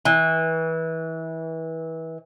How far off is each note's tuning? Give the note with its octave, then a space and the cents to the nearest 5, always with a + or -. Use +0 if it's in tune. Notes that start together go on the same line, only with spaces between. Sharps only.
E3 -25